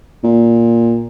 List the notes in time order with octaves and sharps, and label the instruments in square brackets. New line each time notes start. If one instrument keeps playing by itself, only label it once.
[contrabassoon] A#2